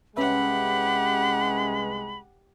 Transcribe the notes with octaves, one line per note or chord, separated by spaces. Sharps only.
C2 G#3 C#4 G4 B4 E5 F#5 B5